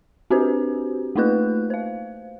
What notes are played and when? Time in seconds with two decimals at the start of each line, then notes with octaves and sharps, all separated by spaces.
0.30 C4 D4 F#4 G4 B4 C5
1.16 A3 A#3 D#4 F4 B4 F#6
1.70 C5 F5